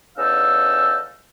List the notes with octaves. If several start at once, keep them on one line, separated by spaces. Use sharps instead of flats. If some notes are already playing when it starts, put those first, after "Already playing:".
E2 C#4 D#4 A4 F5 E6